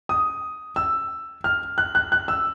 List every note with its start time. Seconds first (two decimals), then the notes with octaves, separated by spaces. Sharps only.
0.09 D#6
0.76 E6
1.44 F6
1.78 F#6
1.95 F#6
2.12 F#6
2.28 E6